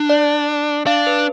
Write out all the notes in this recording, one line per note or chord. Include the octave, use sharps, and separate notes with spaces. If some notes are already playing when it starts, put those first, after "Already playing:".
Already playing: D4
D5
D4 F5
B4